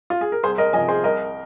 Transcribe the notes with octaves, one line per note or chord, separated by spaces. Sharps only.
F4
G#4
A#4
C2 G#4 C5
A#4 D#5
C3 F3 D#5 G#5
G#4 C5
C2 A#4 D#5